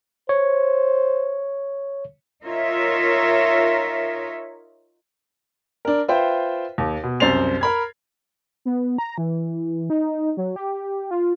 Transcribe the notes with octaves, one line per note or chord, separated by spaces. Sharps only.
C5 C#5
D#4 F4 A#4 C#5 E5
D4 A#4
F4 B4 C5 E5 G5
D#2
B2
C2 F#2 C5 A6 C7 F7
A#4 B5 G#6
B3
A#5
E3
D#4
F#3
G4
F4